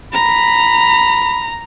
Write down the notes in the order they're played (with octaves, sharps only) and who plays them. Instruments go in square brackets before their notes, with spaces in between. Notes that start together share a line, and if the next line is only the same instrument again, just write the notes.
[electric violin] A#5 [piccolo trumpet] B5